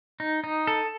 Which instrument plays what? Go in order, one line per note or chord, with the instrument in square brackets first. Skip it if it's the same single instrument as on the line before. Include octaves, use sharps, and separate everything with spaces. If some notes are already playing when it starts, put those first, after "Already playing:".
[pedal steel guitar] D#4
D#4
A4